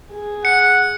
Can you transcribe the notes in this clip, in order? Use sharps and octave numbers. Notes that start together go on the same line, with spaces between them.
G#4
F#5 C#7